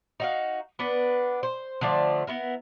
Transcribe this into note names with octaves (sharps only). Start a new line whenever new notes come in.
D#4 F#4 F5
B3 D4 B4
C5
D3 F3 A3 D5
B3 E4 A#4